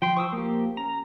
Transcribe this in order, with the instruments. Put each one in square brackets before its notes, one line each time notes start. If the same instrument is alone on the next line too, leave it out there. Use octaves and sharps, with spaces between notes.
[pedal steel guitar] F3 C6 [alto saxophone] G5
[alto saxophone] F3 [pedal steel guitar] C#6 D#6 E6
[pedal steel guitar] A#3 G4
[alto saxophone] C#4 [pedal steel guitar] A#5